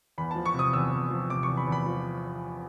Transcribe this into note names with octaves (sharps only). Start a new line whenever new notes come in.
E2 B5
F3 A5
C#6
C3 D#6
E2 E6
E2
F3
C3 D6
C#6
E2
B5
E2
B5
F3